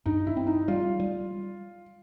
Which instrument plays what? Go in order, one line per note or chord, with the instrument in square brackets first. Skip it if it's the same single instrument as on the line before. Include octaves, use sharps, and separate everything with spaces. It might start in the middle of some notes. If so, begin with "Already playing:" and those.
[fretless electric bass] G2 [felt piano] D#4
[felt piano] E4
[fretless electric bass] C4
[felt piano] D#4
[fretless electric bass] G3 [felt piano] F4
[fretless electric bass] G3